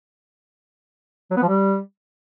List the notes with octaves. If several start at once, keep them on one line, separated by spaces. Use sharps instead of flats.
F#3
B3
F3
G3